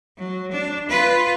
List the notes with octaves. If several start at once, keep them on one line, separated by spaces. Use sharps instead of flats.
F#3
D4
F4 B4